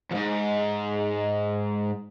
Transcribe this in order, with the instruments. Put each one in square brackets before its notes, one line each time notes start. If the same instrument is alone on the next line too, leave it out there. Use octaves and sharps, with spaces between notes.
[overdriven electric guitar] E2 G#2